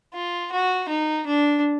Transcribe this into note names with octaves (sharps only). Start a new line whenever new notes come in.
F4
F#4
D#4
D4